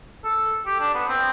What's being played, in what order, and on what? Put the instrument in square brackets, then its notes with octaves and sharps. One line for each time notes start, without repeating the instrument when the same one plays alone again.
[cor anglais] A4
G4
D4
B3
C4